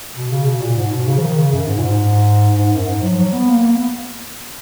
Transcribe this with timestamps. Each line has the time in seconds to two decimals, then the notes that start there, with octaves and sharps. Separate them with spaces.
0.16 B2
0.32 C#3
0.46 B2
0.61 A#2
0.77 G#2
0.91 B2
1.08 C#3
1.18 F3
1.22 D#3
1.37 C#3
1.53 F#2
1.67 G#2
1.78 A#2
1.83 G#2
2.57 G#2
2.73 F#2
2.87 G#2
3.03 F#3
3.12 F3
3.18 F#3
3.33 B3
3.49 A#3
3.63 A#3
3.72 B3